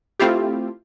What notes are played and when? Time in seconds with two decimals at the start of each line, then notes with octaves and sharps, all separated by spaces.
0.20 A3 C4 E4 F4 G4